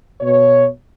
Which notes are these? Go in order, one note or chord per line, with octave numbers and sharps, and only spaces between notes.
B2 C#5